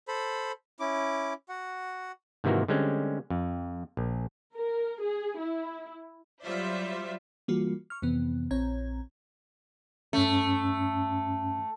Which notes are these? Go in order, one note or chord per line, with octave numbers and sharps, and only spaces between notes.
A4 C5 B5
C#4 E4 D6
F#4 F#5
G#2 C3 D#3 E3 A#3 F#4
D3 G3 G#3 C4 C#4
F2
A#1
A#4
G#4
E4
F#3 G3 F4 C5 D5 E5
E3 G3 A#3 F4 F#4
C#6 F6
F2 C3 E3 B3
A#1 C4 C#5 A#5 G#6
G2 A3 C#4